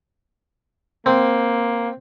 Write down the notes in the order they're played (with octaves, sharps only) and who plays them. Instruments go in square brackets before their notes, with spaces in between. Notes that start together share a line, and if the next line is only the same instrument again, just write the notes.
[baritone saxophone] A#3 [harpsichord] C4